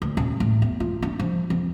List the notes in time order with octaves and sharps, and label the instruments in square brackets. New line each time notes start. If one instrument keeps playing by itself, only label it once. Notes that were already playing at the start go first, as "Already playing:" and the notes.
[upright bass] D2
D#1
A2
E2
F4
D4
F3
F2